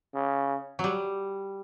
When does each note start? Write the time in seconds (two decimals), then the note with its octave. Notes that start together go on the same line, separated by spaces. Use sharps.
0.14 C#3
0.79 F#3 G3